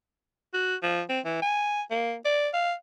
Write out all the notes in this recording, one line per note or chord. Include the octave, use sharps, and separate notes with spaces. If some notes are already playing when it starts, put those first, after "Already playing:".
F#4
F3
C4
E3
G#5
A#3
D5
F5